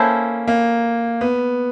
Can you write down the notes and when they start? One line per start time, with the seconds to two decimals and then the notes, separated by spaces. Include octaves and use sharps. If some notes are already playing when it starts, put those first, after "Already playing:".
Already playing: A#3 C#4 E4 A4 C5
0.48 A#3
1.21 B3